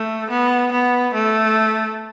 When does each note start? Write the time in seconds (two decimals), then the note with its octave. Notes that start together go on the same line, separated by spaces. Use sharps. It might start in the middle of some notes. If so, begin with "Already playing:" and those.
Already playing: A3
0.31 B3
0.72 B3
1.14 A3